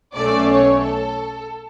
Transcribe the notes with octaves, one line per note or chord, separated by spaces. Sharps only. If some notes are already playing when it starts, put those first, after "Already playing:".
B1 B2 A3 C#4 D5
C#5
A4